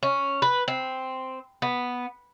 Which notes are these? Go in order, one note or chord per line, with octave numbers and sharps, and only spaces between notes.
C#4
B4
C4
B3